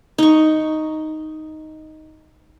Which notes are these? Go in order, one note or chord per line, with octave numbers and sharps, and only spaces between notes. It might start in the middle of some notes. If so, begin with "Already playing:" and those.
D#4 C#6